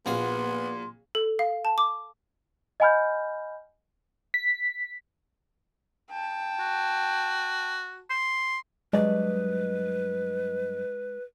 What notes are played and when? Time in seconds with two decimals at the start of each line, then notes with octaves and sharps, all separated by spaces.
0.06 A#1 A#2 B3 F#4 F5 C6
1.15 A4
1.39 F5
1.65 A5
1.78 D6
2.80 D#5 F#5 G#5 B5 F6 G6
4.34 B6
6.10 G5 A5
6.60 F#4
8.10 C6
8.93 G2 F#3 G#3 B4 D5 D#5